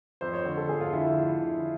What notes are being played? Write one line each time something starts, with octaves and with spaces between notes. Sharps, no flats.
F2 C5
C#5
D3
A4
F2 G#4
F4
D3 E4
E4
F2
D3